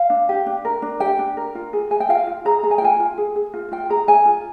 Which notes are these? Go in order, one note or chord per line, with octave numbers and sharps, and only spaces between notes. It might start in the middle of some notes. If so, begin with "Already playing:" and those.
Already playing: F5
D4
G4
D4
A#4
D4
G4 G5
D4
A#4
F4
G#4
G#4 G#5
G5
F4 F5
F4
G#4 A#5
G#4 A#5
G#5
G5
F4 G#5
F4
G#4
G#4
F4
F4 G5
G#4 A#5
G#4 G#5
F4